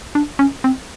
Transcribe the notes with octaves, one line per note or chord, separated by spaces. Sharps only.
D4
C#4
C4